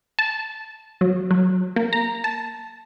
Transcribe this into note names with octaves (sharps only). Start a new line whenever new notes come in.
A5
F#3
F#3
A#3
A#5
A5